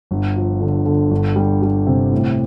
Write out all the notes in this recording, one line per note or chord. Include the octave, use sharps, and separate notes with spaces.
G1
F3
D3
D3
G1
G3
G3
C3
A2